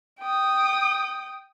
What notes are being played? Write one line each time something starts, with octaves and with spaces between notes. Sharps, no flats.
G5 D#6